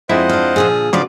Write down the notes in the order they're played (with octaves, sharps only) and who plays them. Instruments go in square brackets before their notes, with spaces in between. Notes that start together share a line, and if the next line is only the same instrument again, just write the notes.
[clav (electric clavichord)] F2 G#3 E4 [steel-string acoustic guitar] D4 [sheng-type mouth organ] C5 D#5 F#5
[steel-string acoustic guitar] D4 F4
[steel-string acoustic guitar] A#2 D3 F3 [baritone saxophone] G#4
[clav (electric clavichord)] C#3 F3 [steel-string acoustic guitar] D4 F4 D5 [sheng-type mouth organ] F#4 D6